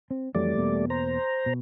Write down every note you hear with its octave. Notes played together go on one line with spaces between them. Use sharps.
C4
F2 E3 F#3 G3 A3 D5
E2 B2 A#3
C5 A#5
B2